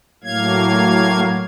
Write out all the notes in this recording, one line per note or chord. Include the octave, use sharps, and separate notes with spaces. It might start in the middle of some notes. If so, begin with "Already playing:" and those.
A2 F#3 A#3 F5 G#6